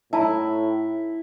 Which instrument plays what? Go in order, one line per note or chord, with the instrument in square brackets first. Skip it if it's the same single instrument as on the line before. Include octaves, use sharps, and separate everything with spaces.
[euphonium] A2 [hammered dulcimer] E4 [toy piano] E5 A5 A#5